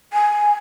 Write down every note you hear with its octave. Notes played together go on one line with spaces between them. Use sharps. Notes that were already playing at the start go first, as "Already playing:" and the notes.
G#5